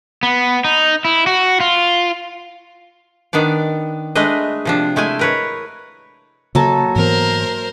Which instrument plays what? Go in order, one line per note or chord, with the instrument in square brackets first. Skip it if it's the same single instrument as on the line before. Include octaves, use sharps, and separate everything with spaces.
[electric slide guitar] B3
D#4
E4
F#4
F4
[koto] D#3 B3 D4 D5
G#3 A3 D4 B4 D#5
C3 F3 D4
G#3 A3 E4 G#5
A#4 B4 C#5
[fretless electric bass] C#3 [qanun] F#3 A4 A5 [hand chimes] A#3 A#5
[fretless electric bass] G#2 E3 B3 [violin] A#4 C5